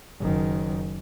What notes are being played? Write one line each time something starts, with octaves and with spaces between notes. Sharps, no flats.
F#1 D#3